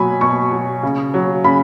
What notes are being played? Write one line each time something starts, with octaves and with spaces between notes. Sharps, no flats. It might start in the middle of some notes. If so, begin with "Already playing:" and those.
Already playing: B2 F#3 G#5 B5
B2 C#6
F#3
C#3
F#3
C#3 B5